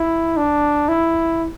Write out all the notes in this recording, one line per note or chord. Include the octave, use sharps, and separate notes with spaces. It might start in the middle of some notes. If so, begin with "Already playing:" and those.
Already playing: E4
D4
E4